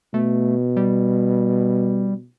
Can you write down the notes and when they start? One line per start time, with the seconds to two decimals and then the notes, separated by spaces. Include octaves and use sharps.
0.14 B2 A3
0.77 G3